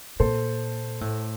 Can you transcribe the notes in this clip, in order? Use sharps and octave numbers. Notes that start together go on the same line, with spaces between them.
A#2 A4 C5
A2